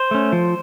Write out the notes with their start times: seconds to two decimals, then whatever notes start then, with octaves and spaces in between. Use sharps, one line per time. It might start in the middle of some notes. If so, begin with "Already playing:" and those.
Already playing: C5
0.11 A3 C#4
0.32 F3